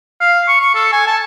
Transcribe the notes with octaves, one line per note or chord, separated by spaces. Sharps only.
F5
C#6
C#6
A4
G#5
A5